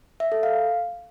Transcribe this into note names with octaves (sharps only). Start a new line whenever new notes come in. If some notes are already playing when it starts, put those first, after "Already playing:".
E5
A4
F5